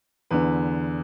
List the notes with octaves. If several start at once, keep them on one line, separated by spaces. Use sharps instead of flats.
E2 D3 B4